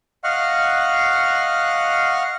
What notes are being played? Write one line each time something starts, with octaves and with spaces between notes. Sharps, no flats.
D#5 F5 F#5 C#6 F6 F#6